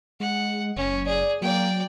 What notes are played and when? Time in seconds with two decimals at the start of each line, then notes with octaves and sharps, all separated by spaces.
0.20 G#3 F#5
0.76 F#1 C#4
1.07 G#4 D5
1.42 F#3 A#3 D5 G5